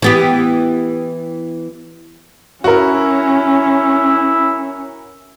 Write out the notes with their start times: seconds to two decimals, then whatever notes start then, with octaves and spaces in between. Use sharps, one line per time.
0.02 E3 B3 G4
2.64 C#4 E4 F#4 A#4